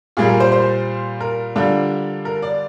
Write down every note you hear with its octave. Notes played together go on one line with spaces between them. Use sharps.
A#2 G3 A#3 G#4
A#4
C5
C5
A#4
D3 G3 D4 F4
A#4
D5